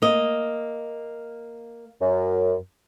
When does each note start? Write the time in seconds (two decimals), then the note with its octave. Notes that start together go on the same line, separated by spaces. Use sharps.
0.02 A#3 D#5
2.01 F#2